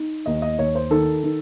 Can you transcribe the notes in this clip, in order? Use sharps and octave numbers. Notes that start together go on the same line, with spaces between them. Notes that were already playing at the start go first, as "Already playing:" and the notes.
Already playing: D#4
D#2 D#5
D#5
D#2 C#5
C5
D#3 A4
D#3